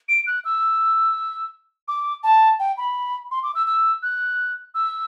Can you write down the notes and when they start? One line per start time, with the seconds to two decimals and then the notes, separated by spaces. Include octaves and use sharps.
0.08 D7
0.27 F#6
0.45 E6
1.88 D6
2.24 A5
2.59 G5
2.77 B5
3.31 C6
3.43 D6
3.55 E6
3.66 E6
4.02 F#6
4.74 E6